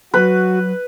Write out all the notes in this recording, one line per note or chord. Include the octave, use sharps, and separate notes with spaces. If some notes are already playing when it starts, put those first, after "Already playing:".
F#3 F#4 B4